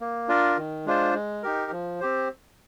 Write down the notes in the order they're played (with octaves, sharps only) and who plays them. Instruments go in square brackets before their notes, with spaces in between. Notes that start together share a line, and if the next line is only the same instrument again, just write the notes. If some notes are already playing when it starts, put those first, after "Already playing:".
[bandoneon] A#3
D4 F4 A#4
D#3
G#3 D4 F4 C5
G#3
D#4 G4 A#4
F3
C4 G4 C5